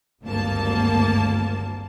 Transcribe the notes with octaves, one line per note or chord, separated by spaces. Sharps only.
G#1 D2 G2 A#3 A5